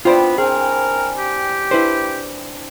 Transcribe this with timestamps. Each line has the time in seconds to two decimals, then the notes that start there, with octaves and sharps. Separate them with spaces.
0.05 B3 C4 D4 E4 F4 C5 D5
0.38 C4 G#4 A#4 G#5
1.18 G4
1.71 D4 E4 B4 C5